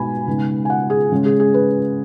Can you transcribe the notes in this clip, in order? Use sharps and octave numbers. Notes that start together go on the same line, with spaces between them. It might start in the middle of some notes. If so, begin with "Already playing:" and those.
Already playing: B2 G#3 D#4 G#5 B5
C#3 G#3 B3 D#4
G#5
F#5
G#4
C#3 G#3 C#4
G#4
G#4
B4